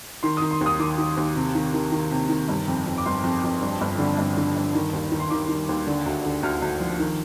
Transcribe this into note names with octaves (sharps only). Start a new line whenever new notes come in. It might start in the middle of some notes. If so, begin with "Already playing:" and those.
D#3 C6
D#3 D#6
C6
D#2
D#6
D#3 D6
D#3
D#2
C3
D#3
D#3
D#3
C3
D#3
G1
F2
F2
D6
G1 C6
F2
F2
G2
G1
D3
G1
D3
G1
D#3
D#2
D#3
C6
D#3 D6
D#3
D#2
D3
D2
D3
D2 F6
D2
F3
D#3